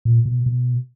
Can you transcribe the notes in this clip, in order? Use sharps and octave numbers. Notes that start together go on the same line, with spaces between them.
A#2
B2
B2